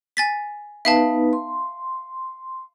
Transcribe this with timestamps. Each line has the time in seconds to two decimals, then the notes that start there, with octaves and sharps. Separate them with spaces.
0.17 G#5 A6 B6
0.85 B3 D#4 B4 E5 F5 A5
1.33 C6